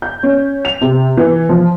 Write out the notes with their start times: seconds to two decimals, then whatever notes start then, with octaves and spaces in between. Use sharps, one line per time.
0.02 G6
0.23 C#4
0.65 F7
0.82 C3
1.17 E3
1.49 F3